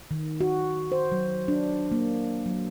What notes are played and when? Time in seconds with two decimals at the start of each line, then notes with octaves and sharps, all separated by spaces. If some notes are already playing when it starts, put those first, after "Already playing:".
0.11 D#3
0.41 F#4
0.92 C5
1.12 F#3
1.48 D4
1.92 A#3
2.46 F#3